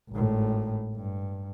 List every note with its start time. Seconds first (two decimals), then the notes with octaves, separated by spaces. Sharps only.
0.10 G#1 A2
0.95 G2